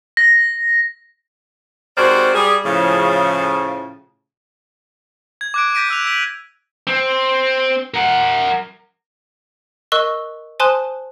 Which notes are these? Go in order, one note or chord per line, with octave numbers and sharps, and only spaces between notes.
A#6
G#2 C3 F#4 A#4 C5 D5
G3 G#4
A2 C#3 F3
G#6
D6 F#6 D7
G6 A#6 B6 D7 D#7
D6 E6 F#6 F7
E6 B6 F#7
C4
A#4 F#5
A#4 D#5 C#6 E6 F#6 G7
C5 G#5 A5 C6 D#6 F#6